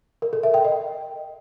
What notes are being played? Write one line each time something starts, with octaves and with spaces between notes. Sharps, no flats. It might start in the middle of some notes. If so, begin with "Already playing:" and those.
A#4
A4
E5
G5
D#5